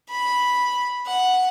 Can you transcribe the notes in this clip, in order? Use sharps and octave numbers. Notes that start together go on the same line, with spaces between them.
B5
F#5